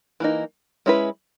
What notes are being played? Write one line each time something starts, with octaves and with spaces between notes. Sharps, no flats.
E3 A#3 D#4
G#3 C#4 E4 G#4 B4